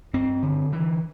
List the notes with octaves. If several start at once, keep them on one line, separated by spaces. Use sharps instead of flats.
G2 C4
D3
D3 E3